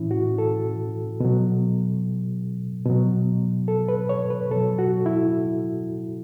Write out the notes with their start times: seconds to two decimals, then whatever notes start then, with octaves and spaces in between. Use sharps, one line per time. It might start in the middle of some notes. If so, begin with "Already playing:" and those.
Already playing: A2 E3 C#4 E4
0.11 F#4
0.38 A4
1.20 B2 F#3
2.86 B2 F#3
3.68 A4
3.88 B4
4.09 C#5
4.30 B4
4.51 B2 F#3 A4
4.79 F#4
5.06 E4